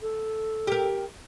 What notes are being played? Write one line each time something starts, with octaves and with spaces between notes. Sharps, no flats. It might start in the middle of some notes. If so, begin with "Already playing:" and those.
A4
G4 A#4